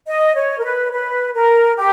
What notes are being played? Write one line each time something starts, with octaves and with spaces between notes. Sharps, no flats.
D#5
C#5
A#4
B4
B4
A#4
G4